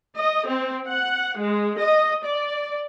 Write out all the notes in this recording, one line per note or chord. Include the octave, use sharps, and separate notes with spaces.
D#5
C4
F#5
G#3
D#5
D5